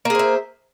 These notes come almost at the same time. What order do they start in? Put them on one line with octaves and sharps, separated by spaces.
A#3 G#4 C5 E5